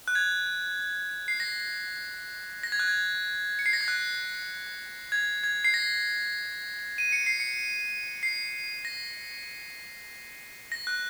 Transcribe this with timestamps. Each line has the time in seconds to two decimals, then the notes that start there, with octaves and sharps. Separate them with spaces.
0.08 F#6
0.15 G#6
1.28 C7
1.40 A#6
2.63 A#6
2.72 G#6
2.79 F#6
2.88 G#6
3.59 C#7
3.66 C7
3.73 A#6
3.81 G#6
3.88 F#6
5.12 G#6
5.44 G#6
5.64 C7
5.74 A#6
6.98 D#7
7.12 C#7
7.26 C7
7.40 C#7
8.23 C7
8.85 A#6
10.72 A#6
10.87 F#6